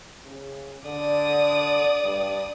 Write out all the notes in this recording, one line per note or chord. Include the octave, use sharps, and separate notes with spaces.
C#3
D3 D5 D#6
G2